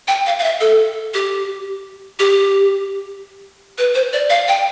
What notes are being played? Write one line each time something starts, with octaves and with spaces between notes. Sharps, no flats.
G5
F5
F5
E5
A4
G4
G4
B4
C5
D5
F5
G5